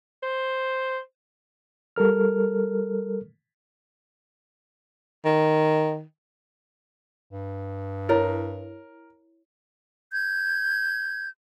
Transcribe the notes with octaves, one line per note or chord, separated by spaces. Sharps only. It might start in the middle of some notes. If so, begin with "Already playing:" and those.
C5
G3 A4 A#4 F6
D#3
G2
E4 A#4 C#5
G6 G#6